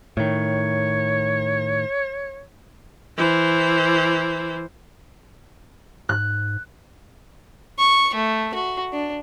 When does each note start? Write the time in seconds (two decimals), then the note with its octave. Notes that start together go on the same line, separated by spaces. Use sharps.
0.17 A2 D#3 C#5
3.17 E3 C5
6.09 G#2 F#6
7.79 C#6
8.15 A3
8.54 F#4
8.93 D4